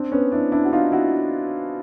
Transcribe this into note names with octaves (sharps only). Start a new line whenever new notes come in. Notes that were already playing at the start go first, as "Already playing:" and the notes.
Already playing: C4 D4
B3 C#4
D4 E4
D4 E4
F#4
D#4 F4
E4 F#4